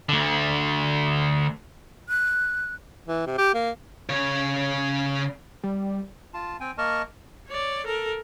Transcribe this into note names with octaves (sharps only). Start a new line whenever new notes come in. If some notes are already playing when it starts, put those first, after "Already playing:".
D2 D3
F#6
E3
C3
G4
A#3
C#3 C#5
G3
F4 A5
C4 G5 G#5
A#3 A#4 D#5 A5 C#6 F6
C#5 D5
A4 A#4